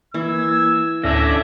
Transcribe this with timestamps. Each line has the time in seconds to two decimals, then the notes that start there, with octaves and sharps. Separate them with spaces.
0.14 E3 A#3 E6 G#6
1.03 D2 A2 D3 C#4 D4 E5 A#6